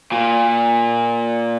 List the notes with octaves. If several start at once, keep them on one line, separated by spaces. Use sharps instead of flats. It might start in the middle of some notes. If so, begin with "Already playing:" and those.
A#2